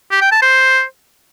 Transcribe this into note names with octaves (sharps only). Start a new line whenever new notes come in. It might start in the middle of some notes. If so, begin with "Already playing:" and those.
G4
G5
A5
C5